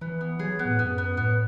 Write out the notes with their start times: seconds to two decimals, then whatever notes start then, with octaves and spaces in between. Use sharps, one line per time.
0.01 E3 B3
0.21 B3
0.40 F#3 G#4
0.59 B3
0.65 A2
0.79 F#2 B3
0.98 B3
1.16 A2 B3